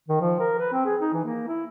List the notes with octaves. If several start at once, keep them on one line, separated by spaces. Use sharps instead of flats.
D#3
F3
A#4
B4
C4
G#4
D#4
E3
A#3
E4